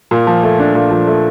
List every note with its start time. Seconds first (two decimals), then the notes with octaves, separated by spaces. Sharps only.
0.11 A#2
0.27 F3
0.43 A3
0.59 D4
0.75 A#2
0.91 F3
1.07 A3